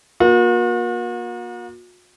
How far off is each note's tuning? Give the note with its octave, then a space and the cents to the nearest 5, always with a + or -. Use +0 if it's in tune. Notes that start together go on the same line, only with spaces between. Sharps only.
A#3 +35 F#4 -45